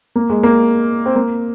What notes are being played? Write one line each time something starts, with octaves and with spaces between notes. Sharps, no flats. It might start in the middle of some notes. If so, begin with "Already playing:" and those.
A#3
G#3
A#3
C4
A#3